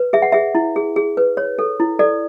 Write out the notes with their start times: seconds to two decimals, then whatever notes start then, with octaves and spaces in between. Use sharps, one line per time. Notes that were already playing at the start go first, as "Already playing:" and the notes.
Already playing: B4
0.13 G#4 E5
0.22 F#5
0.32 G#4 E5
0.55 E4
0.76 G#4
0.96 G#4
1.17 B4
1.37 C#5
1.59 A4
1.80 E4
1.99 A4 D5